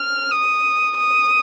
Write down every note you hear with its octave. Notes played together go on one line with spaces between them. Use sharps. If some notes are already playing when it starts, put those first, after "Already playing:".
Already playing: F6
D#6
D#6